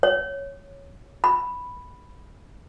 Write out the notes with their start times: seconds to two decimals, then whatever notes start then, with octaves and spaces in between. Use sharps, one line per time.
0.03 C#5
1.24 B5